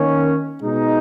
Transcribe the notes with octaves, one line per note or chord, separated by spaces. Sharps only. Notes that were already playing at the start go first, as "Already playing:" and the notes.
Already playing: D#3 A#3 C#4
B2 G#3 D#4